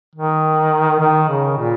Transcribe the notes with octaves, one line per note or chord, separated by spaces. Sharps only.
D#3
D#3
C#3
A#2